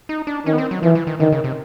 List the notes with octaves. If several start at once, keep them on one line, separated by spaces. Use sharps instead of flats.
D#4
D4
D#3 C#4
B3
C4
F#3
E3 F3
E3
D#3
D3 D#3
C#3
C3